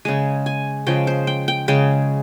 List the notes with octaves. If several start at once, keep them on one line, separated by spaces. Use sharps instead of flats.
C#3 G#3 G#5
G#5
C#3 F3 G#3 G5
C5
G5
G5
C#3 G#3 G5